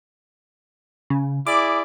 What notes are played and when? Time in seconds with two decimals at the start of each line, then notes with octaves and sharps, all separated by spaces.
1.10 C#3
1.47 E4 G#4 D5 D6